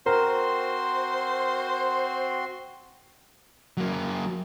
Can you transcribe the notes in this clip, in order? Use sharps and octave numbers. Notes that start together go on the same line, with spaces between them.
C4 F#4 A#4 C5 C6
F#3 A#3